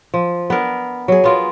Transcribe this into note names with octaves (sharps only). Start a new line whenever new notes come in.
F3
B3 D4 A#4
F#3 G#4
B3 F4 A#4